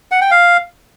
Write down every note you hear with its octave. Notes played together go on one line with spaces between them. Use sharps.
F#5
G5
F5